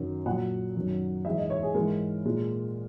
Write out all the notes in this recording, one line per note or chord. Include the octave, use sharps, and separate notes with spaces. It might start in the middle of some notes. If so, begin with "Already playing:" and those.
Already playing: F#2 D#3 F#3
A#2 F#3 F#5
F#2 D#3 F#3
G#2 E3 G#3 E5
D#5
C#5
G#4
G#2 E3 G#3 A#4
A#2 G#3